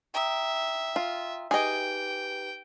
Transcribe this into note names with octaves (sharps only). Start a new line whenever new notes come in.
E5 G5 A#5 D#6
F4
D#4 G4 G#4 B4 D#5 G5